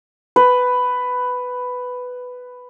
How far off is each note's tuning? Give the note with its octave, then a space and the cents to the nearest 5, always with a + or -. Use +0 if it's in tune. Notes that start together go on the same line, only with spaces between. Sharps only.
B4 +10